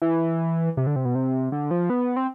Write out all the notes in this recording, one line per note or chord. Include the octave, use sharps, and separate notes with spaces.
E3
C3
D3
C3
B2
C3
D3
F3
B3
C4